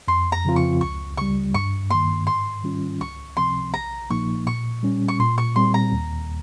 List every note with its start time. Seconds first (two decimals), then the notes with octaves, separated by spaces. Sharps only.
0.08 F2 C6
0.32 A#5
0.45 C#3 F3 C4 F4
0.56 C#6
0.81 C#2 C#6
1.17 C#3 G3 C#6
1.54 G2 C#6
1.90 D#3 A#3 C6
2.27 G#2 C6
2.64 D#3 G3 C#4 F4
3.00 C#2 C#6
3.37 C3 F3 C4 C6
3.73 A#1 A#5
4.10 A#2 F3 A#3 D#4 C#6
4.46 A#2 C#6
4.83 G3 C#4
5.08 C#6
5.20 A#2 C6
5.38 C#6
5.56 G3 C4 C6
5.74 A#5
5.92 D#2